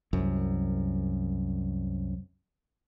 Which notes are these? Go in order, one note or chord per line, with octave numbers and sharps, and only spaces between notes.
C2 F#2